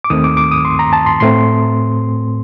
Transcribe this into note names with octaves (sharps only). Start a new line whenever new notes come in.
D6
D#2 D#3 A3 C4 D#6
D6
D6
D#6
C6
A#5
A5
C6
A2 A3 C4 C6